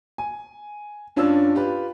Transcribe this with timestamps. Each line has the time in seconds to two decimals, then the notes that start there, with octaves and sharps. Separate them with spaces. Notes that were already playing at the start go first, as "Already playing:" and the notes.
0.18 G#5
1.16 G2 C#4 D4 F4 D5 E6
1.55 F4 G4 B4